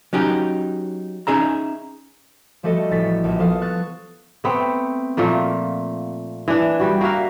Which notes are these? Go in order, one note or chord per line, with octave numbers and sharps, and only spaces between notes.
F#3 C#4 D#4 G4
C#4 D#4 G#4 E5 A#5
F3 G3 A3 F#4 A4 D#5
A1 A6 B6
A#1
F3 B3 A4 F5 D#6
C#6 F#6 A6
A3 B3 C4
A#2 F3 A3 A#3
E3 D4
G3 F#4
A#3 F#4 E5 F5